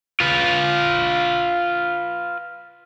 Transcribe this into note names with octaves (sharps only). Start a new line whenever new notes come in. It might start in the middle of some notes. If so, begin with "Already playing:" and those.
F4 B4